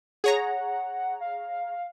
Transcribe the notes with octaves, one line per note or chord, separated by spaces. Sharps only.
G#4 C#5 F#5 A#5
F5